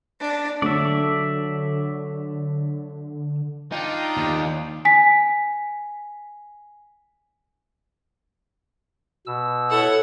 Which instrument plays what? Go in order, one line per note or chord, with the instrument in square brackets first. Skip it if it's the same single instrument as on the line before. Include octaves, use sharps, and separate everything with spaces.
[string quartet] D4
[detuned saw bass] D3 [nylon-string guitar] F#3 A3 C#5 [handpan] D4 [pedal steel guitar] D5 E5
[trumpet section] D4 F4 G5 [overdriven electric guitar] D#4
[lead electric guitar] D#2
[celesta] G#5 B6
[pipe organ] B2 E6
[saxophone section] E4 A4 [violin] C#5 F#5